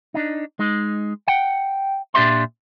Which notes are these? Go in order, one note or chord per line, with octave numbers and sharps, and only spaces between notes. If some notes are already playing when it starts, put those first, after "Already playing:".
D4 D#4
G#3 D#4
F#5 G5
A#2 D4 G4 D#5 E5 C6